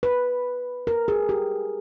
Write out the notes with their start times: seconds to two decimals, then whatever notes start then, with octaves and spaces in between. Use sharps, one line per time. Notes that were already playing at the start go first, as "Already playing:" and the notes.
0.03 B4
0.87 A#4
1.08 G#4
1.29 G4